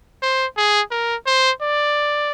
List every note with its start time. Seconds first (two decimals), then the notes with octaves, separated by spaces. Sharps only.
0.22 C5
0.57 G#4
0.91 A#4
1.26 C5
1.61 D5